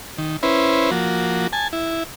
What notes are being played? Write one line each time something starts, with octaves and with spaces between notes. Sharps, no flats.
D#3
C#4 E4 B4 C5
F3 A#3 F#4
G#5 A5
E4